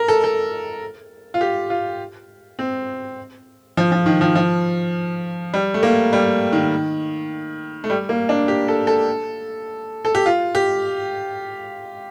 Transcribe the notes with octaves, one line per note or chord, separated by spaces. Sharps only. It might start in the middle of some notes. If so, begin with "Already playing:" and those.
Already playing: A#4
A4
A4
F4
G4
F4
C4
F3
F3
D#3
F3
F3
G3
A3
A#3
G3
D#3
A3
G3
A#3
D4
G4
A4
A4
A4
G4
F4
G4